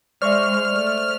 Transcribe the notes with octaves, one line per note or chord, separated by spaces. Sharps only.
G#3 C5 D5 E5 C#6 F6
A3